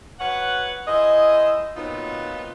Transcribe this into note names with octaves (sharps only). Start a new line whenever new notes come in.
F#3 B4 C#5 F#5
E4 G#4 C5 D#5
A#2 F#3 B3 C4 D#4 F4